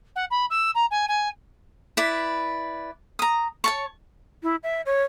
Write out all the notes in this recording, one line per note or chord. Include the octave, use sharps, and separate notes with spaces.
F#5
B5
E6
A#5
G#5
G#5
E4 B4 D5
A#5 D#6
C#5 A5 C#6
E4
E5
C#5